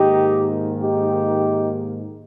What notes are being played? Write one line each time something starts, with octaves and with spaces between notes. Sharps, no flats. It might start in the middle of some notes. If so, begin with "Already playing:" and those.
Already playing: G#2 D#3 A#3 D#4 G4
D#4 G4